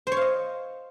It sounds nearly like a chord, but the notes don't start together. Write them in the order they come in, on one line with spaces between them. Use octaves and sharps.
C5 C#5 F5 D#5